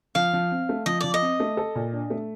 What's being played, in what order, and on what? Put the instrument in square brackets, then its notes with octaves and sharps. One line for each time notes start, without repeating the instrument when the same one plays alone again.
[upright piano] F3 [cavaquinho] F5
[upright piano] F3
C4
A3
[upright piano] F3 [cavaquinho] D#5
[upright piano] F3 [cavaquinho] D5
[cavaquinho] D#5
[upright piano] C4
A3
A4
A#2
D4
A3